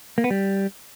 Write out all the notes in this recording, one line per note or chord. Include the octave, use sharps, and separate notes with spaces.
A#3
B3
G3